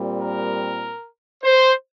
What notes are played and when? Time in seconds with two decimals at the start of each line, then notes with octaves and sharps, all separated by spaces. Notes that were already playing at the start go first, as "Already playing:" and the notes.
Already playing: A#2 G3 C4
0.19 A#4
1.43 C5